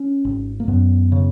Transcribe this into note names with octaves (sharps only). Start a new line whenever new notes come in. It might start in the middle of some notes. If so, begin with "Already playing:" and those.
Already playing: C#4
G#1
A#3
F#2 B3
C#3